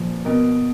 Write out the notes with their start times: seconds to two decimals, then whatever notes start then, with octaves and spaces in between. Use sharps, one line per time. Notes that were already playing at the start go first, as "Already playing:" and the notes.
Already playing: A#2 F3
0.25 B2 A#4